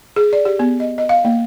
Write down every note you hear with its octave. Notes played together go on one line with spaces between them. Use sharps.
G#4
D5
G4
B3
D#5
D#5
F5
A#3